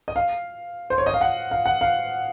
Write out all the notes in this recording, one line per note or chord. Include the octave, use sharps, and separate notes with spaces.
D#5
F5
C5
C#5
D#5
F5
F#5
F5
F#5
F5